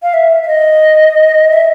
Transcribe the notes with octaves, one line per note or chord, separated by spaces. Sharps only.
F5
E5
E5
D#5
E5